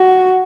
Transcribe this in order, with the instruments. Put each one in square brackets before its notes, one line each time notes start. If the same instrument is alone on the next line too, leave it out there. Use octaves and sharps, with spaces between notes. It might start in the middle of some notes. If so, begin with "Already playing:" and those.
Already playing: [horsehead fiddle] F#4